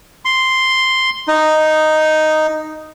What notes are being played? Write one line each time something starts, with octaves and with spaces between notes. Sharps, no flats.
C6
D#4